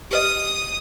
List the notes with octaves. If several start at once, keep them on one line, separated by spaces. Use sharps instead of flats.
G4 B4 D#5 D#6